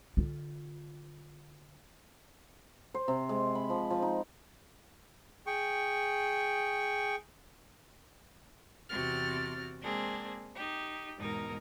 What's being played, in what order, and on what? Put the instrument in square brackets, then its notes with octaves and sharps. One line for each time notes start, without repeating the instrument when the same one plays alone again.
[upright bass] D3 F4
[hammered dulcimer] C5
C3
G#3
B5
F3
F3
D#4
[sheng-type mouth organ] G#4 G5 C#6
[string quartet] E2 C3 C4 F#4 F6 A6
G#3 A#3 C4 D4 G#4
D#4 G4
E2 G#2 B2 D#4 A#4